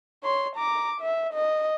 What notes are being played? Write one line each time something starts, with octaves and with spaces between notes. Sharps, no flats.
C#5 C6
A#5 D6
E5
D#5